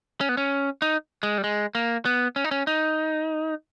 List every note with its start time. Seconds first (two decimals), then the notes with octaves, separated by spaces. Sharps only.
0.21 C#4
0.29 B3
0.37 C#4
0.82 D#4
1.23 G#3
1.38 G3
1.44 G#3
1.75 A#3
2.05 B3
2.36 C#4
2.44 D#4
2.51 C#4
2.67 D#4